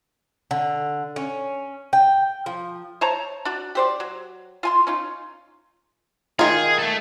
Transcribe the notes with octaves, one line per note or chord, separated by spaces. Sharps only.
D3
C#4
G5
F3
C5 C#5 A5 A#5
D4 F#4
G4 C5 D5
F#3
F4 G#5 C6
C#4 D#4 F4
D#3 F4 G#4
A3 A4